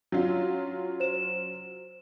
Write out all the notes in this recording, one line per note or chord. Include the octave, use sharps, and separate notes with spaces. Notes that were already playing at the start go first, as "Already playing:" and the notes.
F#3 C#4 F4
C5 E7